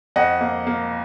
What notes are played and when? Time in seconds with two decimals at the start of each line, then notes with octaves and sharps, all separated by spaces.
0.16 F2 D#5 F#5
0.41 A#3
0.67 A#3